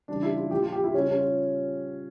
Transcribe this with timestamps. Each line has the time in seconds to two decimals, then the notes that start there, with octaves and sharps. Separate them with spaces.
0.08 C#3 E3 G3 D4
0.22 E4
0.37 F4
0.51 A#2 F3 G4
0.62 F4
0.72 G4
0.84 E4
0.94 C#3 G3 C#4
1.08 C#4
1.18 F4